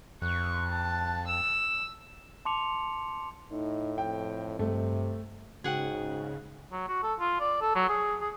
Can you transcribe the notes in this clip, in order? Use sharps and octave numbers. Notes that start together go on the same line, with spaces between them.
F2 C#6 F#6
A5
E6 E7
A5 C6 D6 C#7 F7
A2 D#4
F2 G5
G2 C3 A3
G#2 C#3 F#4 G#4 F#5 G5
F#3
F#4
A4
F4
D5
A4
F#3
G#4
G#4